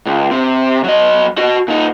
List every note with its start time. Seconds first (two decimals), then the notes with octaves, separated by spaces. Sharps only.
0.06 C#2
0.31 C3
0.84 F#3 D#5
1.38 F#4 D#5
1.68 A#2 D#4